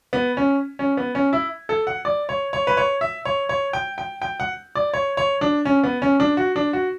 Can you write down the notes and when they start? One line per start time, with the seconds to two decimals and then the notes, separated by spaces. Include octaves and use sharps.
0.13 B3
0.37 C#4
0.79 C#4
0.97 B3
1.15 C#4
1.33 E4
1.69 A4
1.87 F#5
2.05 D5
2.29 C#5
2.53 C#5
2.67 B4
2.77 C#5
3.01 E5
3.25 C#5
3.49 C#5
3.73 G5
3.98 G5
4.22 G5
4.40 F#5
4.75 D5
4.94 C#5
5.17 C#5
5.41 D4
5.65 C#4
5.84 B3
6.02 C#4
6.20 D4
6.37 F#4
6.56 D4
6.73 F#4